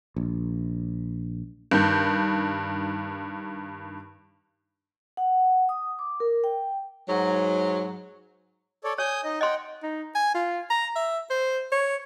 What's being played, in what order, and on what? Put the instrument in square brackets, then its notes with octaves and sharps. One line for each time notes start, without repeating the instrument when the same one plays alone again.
[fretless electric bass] A#1
[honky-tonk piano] G2 D#3 G6
[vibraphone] F#5
D#6
D6
A#4
G5
[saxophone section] G#2 F#3
[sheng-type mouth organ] A4 C#5 D5
[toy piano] C#5 [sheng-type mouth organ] G#5 D#6 G6
[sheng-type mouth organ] D#4 D#5
[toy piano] D#5 C6 [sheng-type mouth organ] F#5 G5
[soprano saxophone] D#4
G#5
F4
A#5
E5
C5
C#5